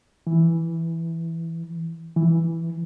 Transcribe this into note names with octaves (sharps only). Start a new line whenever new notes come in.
E3
E3